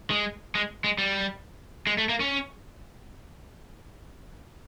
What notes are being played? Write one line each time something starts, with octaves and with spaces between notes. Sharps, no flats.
G#3
G#3
G#3
G3
G#3
A3
A#3
C#4